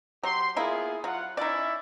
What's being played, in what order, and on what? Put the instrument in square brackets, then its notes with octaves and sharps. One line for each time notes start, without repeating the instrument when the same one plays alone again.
[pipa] F#3 [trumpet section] G4 C6
[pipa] A#3 E4 [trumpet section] B3 F4 G#4
[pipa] F#3 [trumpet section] F4 F#5
[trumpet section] C#4 E4 E5 [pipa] D#4 D5